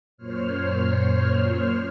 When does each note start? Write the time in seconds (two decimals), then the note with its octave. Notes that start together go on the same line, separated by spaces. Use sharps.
0.17 F#2 A#2 C5 C#5 F6